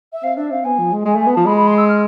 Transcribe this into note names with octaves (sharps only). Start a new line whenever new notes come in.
E5
C4 F5
D4 E5
C4 F5
B3 G#5
F3
G#3
G#3 G#5
A3 G#5
B3
F3 A5
G#3 B5
B5
C6
E6
F6